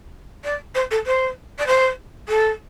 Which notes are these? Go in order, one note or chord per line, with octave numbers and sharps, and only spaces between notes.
D5
C5
A4
C5
D5
C5
A4